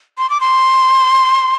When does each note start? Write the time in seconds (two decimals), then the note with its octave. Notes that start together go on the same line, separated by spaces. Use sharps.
0.18 C6
0.30 D6
0.41 C6